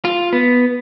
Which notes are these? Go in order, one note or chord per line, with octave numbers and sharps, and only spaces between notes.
F4
B3